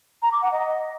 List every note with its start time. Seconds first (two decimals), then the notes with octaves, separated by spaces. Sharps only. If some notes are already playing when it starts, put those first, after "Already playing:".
0.22 A#5
0.32 D6
0.42 F#5
0.51 D#5